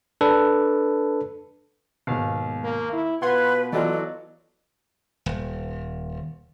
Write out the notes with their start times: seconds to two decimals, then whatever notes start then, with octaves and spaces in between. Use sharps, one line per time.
0.21 D4 A4 B4
2.07 D#2 G#2 B2 F5
2.64 A#3
2.93 E4
3.22 B2 F4 B4 F#5 C6 G#6
3.73 E3 F#3 B3 F4 A4 D5 D#5
5.26 D#1